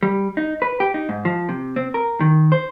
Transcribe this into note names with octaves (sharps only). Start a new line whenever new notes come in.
G3
D#4
B4
G4
D#4
G#2
F3
C3
C4
A#4
D#3
C5